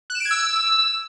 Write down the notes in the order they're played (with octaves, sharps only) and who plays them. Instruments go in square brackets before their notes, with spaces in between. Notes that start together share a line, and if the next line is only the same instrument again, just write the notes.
[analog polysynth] F#6
E7
D7
G#6
E6